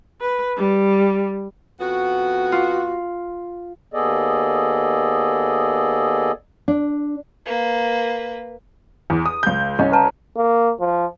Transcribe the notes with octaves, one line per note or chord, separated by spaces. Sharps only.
B4
G3
F2 B3 F#4
F4
D#2 B3 G#4 A4 D5 D#5
D4
A#3 B4
E2
D#6
C#2 G6
C2 C#4 D#5
B4 A5 A#5
A#3
F3